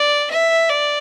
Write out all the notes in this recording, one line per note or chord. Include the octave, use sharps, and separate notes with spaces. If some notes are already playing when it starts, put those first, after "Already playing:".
Already playing: D5
E5
D5